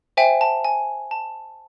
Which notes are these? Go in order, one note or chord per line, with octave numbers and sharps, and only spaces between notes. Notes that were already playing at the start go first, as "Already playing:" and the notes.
C5 E5 G5 G#5
A5
G#5
A5